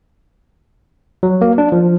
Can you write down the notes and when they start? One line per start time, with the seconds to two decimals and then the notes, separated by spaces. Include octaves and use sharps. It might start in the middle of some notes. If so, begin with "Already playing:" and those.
1.23 F#3
1.41 A#3
1.58 D4
1.72 F3